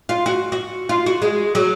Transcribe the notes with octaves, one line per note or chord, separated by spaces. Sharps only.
F4
F#4
F#4
F4
F#4
G#3
F#3